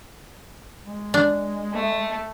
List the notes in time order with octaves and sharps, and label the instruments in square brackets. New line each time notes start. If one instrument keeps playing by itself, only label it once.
[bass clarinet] G#3
[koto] D4
[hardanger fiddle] A3